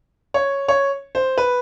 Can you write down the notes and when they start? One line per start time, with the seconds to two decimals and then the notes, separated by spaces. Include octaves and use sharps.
0.34 C#5
0.68 C#5
1.15 C5
1.38 B4